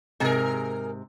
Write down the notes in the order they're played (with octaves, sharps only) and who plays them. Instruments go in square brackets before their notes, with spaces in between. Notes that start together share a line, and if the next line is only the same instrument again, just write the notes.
[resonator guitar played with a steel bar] G#2 C3 [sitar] G#4 A#4